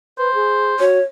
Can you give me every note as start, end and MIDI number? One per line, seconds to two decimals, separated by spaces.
0.19 0.33 71
0.19 0.84 72
0.35 0.78 68
0.80 0.99 66
0.80 1.02 73